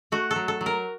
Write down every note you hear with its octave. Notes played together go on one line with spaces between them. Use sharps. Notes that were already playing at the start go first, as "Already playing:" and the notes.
A3 F#4
A4
F#3
A4
F#3
A#4